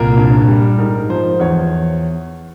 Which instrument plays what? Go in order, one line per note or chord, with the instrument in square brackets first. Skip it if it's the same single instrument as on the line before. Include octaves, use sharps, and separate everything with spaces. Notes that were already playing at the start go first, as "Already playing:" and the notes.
Already playing: [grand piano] C2 A#2 A#4
G2
G3
G#2 A#4
F3 C5
E2 C#5